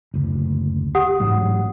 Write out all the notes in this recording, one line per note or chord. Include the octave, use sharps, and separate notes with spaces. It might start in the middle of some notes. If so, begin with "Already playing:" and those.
F#1 D2
G4 F#5 D#6
A1 G#2 F#3